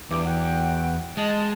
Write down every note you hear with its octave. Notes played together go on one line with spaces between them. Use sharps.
E2 G2 D6
F#4 F#5 G5
G#3 D#5 A5